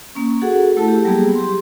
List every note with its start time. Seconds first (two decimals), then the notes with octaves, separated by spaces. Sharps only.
0.15 A#3 C#4
0.41 F#4 G#4 A4 F#5
0.77 A3 E4 A4 A5
0.88 G4
1.04 F#3 G3 A#3 B3 G4 G#4
1.35 G4 C6